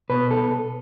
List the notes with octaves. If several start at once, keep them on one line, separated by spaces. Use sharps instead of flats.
B2 B4
A4